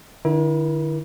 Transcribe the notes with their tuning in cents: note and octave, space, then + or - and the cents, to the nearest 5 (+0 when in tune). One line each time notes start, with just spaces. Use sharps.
D3 +45 E4 +0 A#4 +45